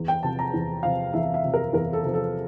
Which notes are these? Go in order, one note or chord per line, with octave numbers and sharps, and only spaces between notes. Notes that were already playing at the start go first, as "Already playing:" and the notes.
Already playing: E2
G5
C3 F3 A5
A#5
E2
C3 F3 F5
E2 E5
E5
C3 F3
A#4
E2 A#4
A4
C3 F3
A4